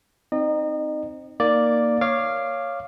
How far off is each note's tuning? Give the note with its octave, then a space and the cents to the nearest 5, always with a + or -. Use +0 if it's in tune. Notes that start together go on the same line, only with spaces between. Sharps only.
C4 +0 D#4 +0 D#5 -35
A#3 +0 D#4 +0 D5 +0
C#5 +0 F5 -10 D6 +20